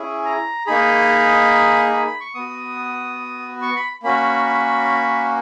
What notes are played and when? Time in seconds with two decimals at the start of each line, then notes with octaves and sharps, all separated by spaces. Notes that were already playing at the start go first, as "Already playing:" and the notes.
Already playing: C#4 E4 G#4
0.25 A#5
0.67 A#3 D#4 G#4 B5
1.93 B5
2.07 B5
2.21 C#6
2.35 B3 F#4 D#6
3.62 C#6
3.76 B5
4.03 A#3 C#4 F#4 B5
4.46 B5